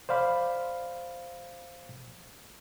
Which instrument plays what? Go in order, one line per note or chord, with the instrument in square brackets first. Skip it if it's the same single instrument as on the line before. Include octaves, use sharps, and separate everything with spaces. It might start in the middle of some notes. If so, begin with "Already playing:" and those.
[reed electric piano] C5 D5 F5 B5